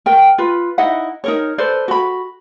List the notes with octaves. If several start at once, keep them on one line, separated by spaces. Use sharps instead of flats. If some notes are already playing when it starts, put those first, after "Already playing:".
A#4 G5
F4 B4
D#4 E4 D#5 F#5
D#4 A#4 C#5
A4 B4 C5 D5
F#4 B5